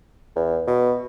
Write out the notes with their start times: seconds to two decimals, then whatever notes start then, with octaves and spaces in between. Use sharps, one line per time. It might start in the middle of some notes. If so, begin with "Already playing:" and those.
0.36 E2
0.68 B2